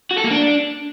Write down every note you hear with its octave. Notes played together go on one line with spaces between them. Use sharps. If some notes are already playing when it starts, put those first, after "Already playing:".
F#4
A4
A#3
D4